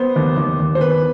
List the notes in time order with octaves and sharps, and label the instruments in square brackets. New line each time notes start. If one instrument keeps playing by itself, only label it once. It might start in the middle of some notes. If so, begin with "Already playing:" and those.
Already playing: [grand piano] B3 [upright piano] C5
[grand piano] D#2
D#2
D#2
[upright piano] C5
[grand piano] B3 [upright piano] B4